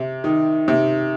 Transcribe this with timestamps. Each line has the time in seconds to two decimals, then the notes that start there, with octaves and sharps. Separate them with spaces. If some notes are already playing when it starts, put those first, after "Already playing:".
Already playing: C3
0.24 D#3
0.68 C3